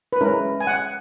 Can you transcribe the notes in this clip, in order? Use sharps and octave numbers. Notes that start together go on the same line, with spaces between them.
B4
G#3 C#4 E4 A#4
G#5
F#5